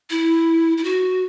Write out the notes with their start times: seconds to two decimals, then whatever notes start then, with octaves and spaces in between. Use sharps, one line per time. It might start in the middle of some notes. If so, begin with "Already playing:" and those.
0.10 E4
0.77 E4
0.84 F#4